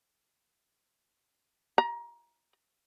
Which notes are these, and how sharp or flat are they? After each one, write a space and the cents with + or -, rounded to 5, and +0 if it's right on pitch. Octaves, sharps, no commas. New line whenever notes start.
A#5 +25